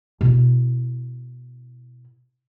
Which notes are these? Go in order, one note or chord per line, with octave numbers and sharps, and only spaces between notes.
B2 E4